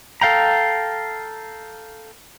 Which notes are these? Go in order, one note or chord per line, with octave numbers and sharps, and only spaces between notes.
A4 F5 G5 A#5